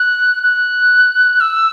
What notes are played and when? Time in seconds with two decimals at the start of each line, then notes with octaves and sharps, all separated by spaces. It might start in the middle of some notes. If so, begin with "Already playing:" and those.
Already playing: F#6
0.43 F#6
1.40 E6